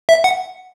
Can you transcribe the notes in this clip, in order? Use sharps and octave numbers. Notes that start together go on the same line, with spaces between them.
E5
F#5